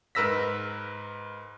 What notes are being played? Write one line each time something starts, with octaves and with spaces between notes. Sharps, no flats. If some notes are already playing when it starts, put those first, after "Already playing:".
G#2 A#4 B4 E6 A#6 B6